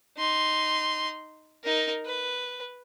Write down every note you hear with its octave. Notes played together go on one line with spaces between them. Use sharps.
D#4 C6
D#4 A#4
B4